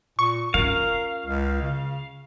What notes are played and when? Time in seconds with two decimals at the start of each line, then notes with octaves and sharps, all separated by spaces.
0.19 A#2 C#6
0.54 C#4 F4 A#4 F5
1.26 C#2
1.61 C#3